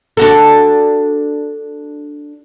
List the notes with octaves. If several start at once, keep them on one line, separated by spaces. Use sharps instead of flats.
D4 F#4 A4